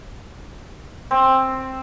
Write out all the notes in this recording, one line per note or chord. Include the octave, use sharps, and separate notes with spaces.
C4